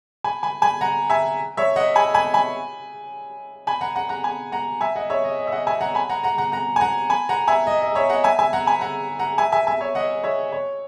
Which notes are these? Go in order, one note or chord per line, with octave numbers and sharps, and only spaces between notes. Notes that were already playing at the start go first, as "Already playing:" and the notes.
G#5 B5
G#5 B5
G#5 B5
F#5 A#5
E5 G#5
C#5 E5
D#5 F#5
G#5 B5
G#5 B5
G#5 B5
G#5 B5
F#5 A#5
F#5 A#5
F#5 A#5
G#5 B5
F#5 A#5
E5 G#5
D#5 F#5
C#5 E5
D#5
D#5
E5
D#5 F#5
E5 G#5
F#5 A#5
G#5 B5
F#5 A#5
F#5 A#5
F#5 A#5
F#5 A#5
G#5
F#5 A#5
G#5 B5
F#5 A#5
E5 G#5
D#5
D#5
C#5 E5
D#5 F#5
E5 G#5
E5 G#5
F#5 A#5
G#5 B5
F#5 A#5
F#5 A#5
E5 G#5
E5 G#5
E5 G#5
C#5 E5
D#5 F#5
C#5 E5
C#5